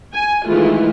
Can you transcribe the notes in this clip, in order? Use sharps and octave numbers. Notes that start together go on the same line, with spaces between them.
G#5
D#3 E3 G#3 A3 E4 F4